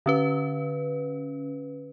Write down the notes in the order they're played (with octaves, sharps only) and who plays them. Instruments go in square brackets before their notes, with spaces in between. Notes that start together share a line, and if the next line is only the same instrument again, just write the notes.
[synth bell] D3 C#4 B4